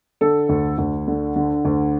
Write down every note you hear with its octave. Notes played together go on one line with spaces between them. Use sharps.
D3 A4
D2
D2
D3
D3
D2